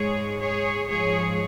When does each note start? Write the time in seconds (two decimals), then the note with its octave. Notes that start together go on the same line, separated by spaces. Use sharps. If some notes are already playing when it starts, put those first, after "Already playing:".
Already playing: G#2 G#3 G#4 C#5
0.40 G#4 C#5
0.88 G#2 F3 G#3 G#4 C#5